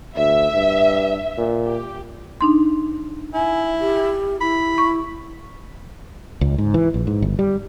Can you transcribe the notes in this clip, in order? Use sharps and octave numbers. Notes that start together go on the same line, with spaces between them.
D2 E5
G2
A#2
G4
D4 D#4 C6
E4 G#5
G4
E4 B5
C#6
C#2
G#2
E3
A#1
G#2
G1
G3